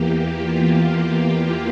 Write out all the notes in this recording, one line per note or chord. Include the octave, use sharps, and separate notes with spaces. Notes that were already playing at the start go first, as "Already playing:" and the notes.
Already playing: E2 E3 A#3 G4
F4